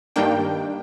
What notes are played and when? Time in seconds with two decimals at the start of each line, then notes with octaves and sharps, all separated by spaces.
0.16 G2 D#3 G3 A#3 D4 G5